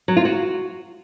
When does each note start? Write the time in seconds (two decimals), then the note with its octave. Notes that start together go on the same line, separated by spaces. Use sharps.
0.08 F#3
0.17 F4
0.25 F#4